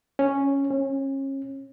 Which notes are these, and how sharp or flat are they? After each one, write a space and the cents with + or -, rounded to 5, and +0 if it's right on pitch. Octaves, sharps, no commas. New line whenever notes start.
C#4 +0
C#4 -30